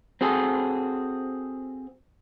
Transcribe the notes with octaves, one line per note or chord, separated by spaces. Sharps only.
C4 F#4 G#4 A4